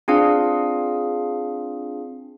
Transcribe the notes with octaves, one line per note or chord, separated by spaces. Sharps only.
C4 D4 F4 G#4 F5